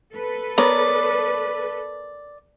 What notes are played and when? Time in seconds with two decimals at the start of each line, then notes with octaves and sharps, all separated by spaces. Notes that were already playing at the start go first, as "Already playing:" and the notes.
0.13 A4 B4
0.58 B3 A#4 C#5 D5